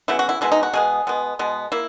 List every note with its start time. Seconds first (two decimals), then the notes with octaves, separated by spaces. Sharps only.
0.08 C#3 F#3 B3 E4
0.19 F#4
0.29 E4
0.41 B2 G#3 B3 E4
0.52 D#4
0.63 F#4
0.73 B2 G#3 B3 G#4
1.07 B2 G#3 B3
1.39 B2 G#3 B3
1.72 A#3 E4